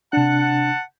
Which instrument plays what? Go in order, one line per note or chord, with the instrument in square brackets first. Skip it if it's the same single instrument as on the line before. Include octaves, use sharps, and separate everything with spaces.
[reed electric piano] C3 D4 [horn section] F#5 A5